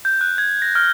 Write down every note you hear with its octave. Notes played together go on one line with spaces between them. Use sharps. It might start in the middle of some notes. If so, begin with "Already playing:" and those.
G6
F#6
G#6
A#6
F6